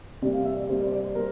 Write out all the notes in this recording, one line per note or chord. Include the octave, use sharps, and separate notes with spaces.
C3 G3 A#3 D5
F5
E5
D5
C3 G3 A#3 C5
D5
D5
C5
G3 A#3 A#4